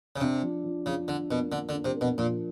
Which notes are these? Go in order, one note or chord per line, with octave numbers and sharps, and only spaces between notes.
C#3
C3 D4
F3
F3
C#3 F3
D3 D4
B2 A#3
D3 D4
D3
D4
C3
A#3
B2
A#2 F3